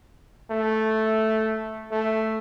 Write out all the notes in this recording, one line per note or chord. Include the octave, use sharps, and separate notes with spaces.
A3
A3